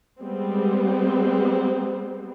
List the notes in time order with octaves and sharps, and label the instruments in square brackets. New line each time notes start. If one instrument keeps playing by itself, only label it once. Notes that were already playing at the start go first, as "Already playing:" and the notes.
[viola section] G3 G#3 B3 C4